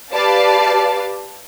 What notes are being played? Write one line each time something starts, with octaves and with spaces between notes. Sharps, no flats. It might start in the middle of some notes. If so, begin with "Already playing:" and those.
G4 B4 D5 F5 A5